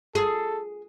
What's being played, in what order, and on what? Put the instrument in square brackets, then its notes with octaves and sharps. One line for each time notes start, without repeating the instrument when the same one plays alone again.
[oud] G#4 [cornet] A4